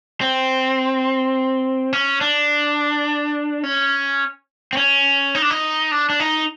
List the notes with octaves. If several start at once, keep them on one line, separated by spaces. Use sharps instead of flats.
C4
C#4
D4
C#4
C4
C#4
D#4
D4
D#4
D4
D4
D#4